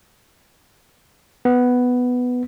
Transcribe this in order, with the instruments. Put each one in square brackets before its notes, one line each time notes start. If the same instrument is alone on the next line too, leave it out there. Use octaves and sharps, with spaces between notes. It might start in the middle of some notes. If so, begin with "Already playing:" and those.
[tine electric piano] B3